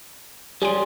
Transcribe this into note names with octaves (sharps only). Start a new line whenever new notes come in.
G3 C#4 G4 G#4 D5 C6 D7